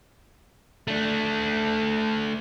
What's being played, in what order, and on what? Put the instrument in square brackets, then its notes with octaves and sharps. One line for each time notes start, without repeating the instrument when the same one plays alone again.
[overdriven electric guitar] A3 D4